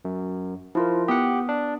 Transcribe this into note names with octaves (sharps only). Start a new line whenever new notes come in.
F#2
F3 E4 F4 A#4
B3 G4 F#5 D#6
D4